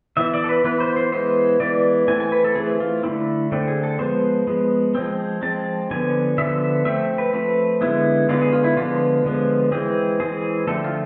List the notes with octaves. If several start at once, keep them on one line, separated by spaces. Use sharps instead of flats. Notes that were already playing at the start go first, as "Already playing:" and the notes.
E3 B3 E5
D5
A4
B4
E3 B3 B4
C5
C5
E3 G#3 B3 C5
E3 G#3 B3 D5
E3 A3 C4 G#5
G#5
B4
A4
E3 A3 C4 G#4
F4
D3 A3 C4 E4
D3 A3 C4
G#4
A4
F3 G#3 B3 C5
F3 G#3 B3
F3 G#3 C4
F3 G#3 C4 A5
D3 F3 B3 G#5
D3 F3 B3 E5
F3 A3 C4 E5
B4
F3 A3 C4 B4
D3 G#3 B3 E4
D3 G#3 B3 F4
G#4
F4
E4
D3 F3 G#3 B3 F4
D3 F3 G#3 B3
E3 G#3 C4 G#4
E3 G#3 C4 G#4
D3 F3 A3 C4 A4
F4